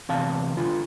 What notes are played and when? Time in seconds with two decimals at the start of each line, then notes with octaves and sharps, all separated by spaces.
0.09 E2 C3 F5 A5
0.57 D3 F4